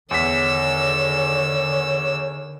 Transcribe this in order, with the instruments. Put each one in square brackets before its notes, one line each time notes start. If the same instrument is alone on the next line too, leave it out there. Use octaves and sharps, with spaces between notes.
[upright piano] E2 B6 [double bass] D3 D#3 [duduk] C#5 [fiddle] E6